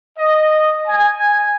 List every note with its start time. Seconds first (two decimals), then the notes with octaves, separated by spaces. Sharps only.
0.18 D#5
0.87 G#5